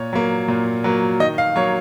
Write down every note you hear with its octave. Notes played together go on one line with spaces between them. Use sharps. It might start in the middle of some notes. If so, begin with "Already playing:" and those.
Already playing: A#2 C#5
F#3 A#3
A#2
F#3 A#3
D#3 D#5
F5
F#3 A#3 C#5